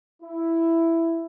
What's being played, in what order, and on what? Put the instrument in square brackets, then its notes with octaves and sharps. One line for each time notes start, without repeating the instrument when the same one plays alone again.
[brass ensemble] E4